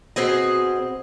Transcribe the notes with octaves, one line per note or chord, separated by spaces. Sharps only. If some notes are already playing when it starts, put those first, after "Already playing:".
B2 C4 G#4 D#5